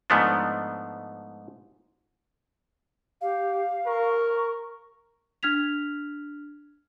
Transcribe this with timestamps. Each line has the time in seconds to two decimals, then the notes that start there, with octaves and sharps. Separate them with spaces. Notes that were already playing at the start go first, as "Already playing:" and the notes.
0.10 G#2 F3 A3 B3 D4
3.21 G4 F5
3.86 A#4 C#6
5.43 D4 F6 G#6 B6 F7